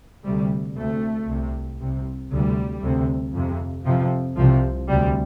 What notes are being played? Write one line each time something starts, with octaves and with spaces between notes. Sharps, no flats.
D2 C3 G3
D2 C3 A3
C2 C3
C2 C3
D2 C3 G3
D2 C3
F2 C3
F2 C3 F3
C2 C3 F3
D2 C3 G3